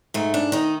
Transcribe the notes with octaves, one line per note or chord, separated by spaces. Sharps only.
G#2 A3
D4
D#3 D#4